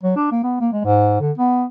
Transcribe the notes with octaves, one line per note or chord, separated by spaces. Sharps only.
F#3
D4
A#3
B3
A#3
G#3
G#2
D3
B3